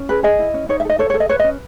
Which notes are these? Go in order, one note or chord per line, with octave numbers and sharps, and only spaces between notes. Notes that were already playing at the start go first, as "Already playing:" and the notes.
Already playing: C#4
G#4 B4
G#4 D#5
E4
C#4
D#4 C#5
E5
A4
D#5
A4 C#5
C#5
A4
D#5
B4 C#5
D#5
C#4